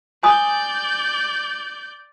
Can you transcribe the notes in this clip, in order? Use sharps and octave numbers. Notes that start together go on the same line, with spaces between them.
D5 G#5 D#6 G6